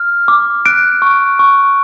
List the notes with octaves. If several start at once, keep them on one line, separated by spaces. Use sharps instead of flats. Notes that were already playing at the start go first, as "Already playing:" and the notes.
Already playing: F6
D6
F#6 D7
C#6
C#6